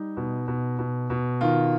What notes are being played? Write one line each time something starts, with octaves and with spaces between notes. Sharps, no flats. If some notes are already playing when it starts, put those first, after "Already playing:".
Already playing: G3 D#4
B2
B2
B2
B2
D#3 F4